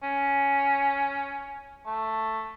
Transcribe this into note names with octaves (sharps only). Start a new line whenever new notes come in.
C#4
A3